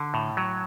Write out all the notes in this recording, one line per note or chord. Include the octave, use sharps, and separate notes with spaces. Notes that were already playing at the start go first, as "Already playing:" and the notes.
Already playing: D3
A2
F#3